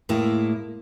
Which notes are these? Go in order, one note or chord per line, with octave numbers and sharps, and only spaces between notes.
A2 G#3 A#3 E4